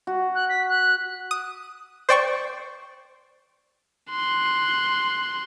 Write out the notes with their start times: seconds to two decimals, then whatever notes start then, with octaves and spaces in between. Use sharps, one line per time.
0.07 F#4
0.34 F#6
0.49 B6
0.68 F#6
1.31 D#6
2.09 C5 D5 G5 C#6
4.10 C6 F#6